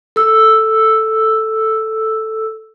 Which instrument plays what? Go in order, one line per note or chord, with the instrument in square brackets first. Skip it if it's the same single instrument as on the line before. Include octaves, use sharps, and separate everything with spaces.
[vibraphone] A4 E6